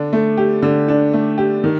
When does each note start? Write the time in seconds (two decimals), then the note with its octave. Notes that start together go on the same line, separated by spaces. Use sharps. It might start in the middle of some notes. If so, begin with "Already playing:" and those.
Already playing: D3 D4
0.13 A3
0.37 G4
0.62 D3
0.88 D4
1.13 A3
1.38 G4
1.64 D#3